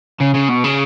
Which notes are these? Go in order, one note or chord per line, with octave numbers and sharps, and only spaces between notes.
C#3
C#3
B2
C#3